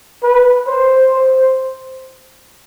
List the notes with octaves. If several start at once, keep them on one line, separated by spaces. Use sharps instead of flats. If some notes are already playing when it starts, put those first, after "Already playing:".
B4
C5
C5